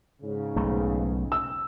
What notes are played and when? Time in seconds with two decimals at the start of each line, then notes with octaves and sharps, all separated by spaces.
0.22 G#2 C#3
0.56 B1 A3
1.32 E6